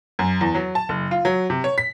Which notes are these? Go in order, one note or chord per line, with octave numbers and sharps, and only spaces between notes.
F#2
E2
F#3
A5
F#1
F4
F#3
C3
C#5
B6